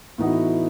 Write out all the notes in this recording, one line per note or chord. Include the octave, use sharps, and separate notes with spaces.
A2 E3 B3 D#4 F#4